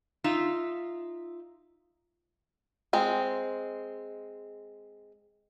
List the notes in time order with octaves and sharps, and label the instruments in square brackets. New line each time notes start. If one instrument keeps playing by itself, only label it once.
[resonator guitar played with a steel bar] D#4 F4 E5
[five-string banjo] G#3 C4